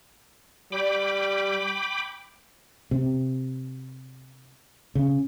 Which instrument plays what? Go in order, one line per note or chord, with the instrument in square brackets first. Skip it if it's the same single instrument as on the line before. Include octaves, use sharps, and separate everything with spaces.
[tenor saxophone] G3 [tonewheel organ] G5 B5 D6
[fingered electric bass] C3
C#3